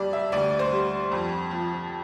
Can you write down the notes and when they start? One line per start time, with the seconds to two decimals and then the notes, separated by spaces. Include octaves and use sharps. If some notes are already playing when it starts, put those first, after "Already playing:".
Already playing: F2 G3 D5
0.13 E5
0.32 D2 D5
0.59 C5
0.72 G3
1.12 F2
1.51 F3